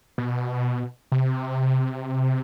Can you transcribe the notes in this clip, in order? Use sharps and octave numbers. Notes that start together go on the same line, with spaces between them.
B2
C3